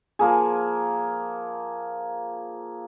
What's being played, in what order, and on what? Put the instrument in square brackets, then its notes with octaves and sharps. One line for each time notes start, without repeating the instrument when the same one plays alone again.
[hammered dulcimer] F3 A#3 G#4